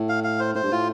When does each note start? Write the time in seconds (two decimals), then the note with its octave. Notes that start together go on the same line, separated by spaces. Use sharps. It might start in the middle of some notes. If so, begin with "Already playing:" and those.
Already playing: A2
0.09 F5
0.24 F5
0.39 C5
0.55 A2 C5
0.63 G2
0.71 A2 F4